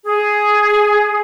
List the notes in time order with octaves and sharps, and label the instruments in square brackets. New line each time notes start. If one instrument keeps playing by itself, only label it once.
[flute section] G#4